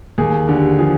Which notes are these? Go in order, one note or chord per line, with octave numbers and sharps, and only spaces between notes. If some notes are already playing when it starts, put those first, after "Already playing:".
D#2 G#4
D3 G4
F3 G#4